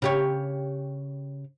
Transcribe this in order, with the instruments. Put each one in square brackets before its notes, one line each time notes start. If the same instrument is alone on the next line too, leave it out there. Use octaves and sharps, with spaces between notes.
[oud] C#3 G4 C#5